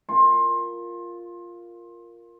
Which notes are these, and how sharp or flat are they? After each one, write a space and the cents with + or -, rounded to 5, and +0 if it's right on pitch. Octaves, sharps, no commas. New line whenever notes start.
F4 +0 A#4 +0 C6 +25